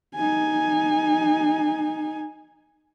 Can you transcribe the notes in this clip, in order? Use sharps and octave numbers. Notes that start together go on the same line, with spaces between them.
D#4 G#5